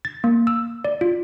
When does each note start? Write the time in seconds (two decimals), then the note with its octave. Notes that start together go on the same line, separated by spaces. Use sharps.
0.05 A6
0.24 A#3
0.47 E6
0.85 D5
1.01 F4